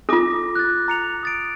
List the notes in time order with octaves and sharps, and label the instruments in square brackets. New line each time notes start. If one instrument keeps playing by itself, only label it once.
[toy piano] F4 A4 [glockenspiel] D6 A#6
[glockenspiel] F#6 A6
A#5 C#7 F7
D#6 A6 D7